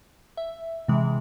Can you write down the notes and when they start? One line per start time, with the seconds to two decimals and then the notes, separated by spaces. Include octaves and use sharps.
0.37 E5
0.88 C3 E3 G#3